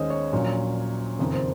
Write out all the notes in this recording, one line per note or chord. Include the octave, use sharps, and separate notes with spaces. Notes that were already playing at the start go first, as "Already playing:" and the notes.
Already playing: D#2 D#3 G#3 C#4 C5 C#5 D#5
C#5
A#1 A#2 F#3 C#4
F#1 F2 D#3
C5